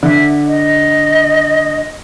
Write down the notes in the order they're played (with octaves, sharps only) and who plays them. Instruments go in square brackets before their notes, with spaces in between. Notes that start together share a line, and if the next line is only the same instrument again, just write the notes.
[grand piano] D3 [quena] E5
[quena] D#5